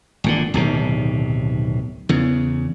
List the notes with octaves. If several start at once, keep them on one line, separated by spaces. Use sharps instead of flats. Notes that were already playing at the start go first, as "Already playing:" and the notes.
G#1 A#2 D3
D1 B1 C3 D#3
E2 C#3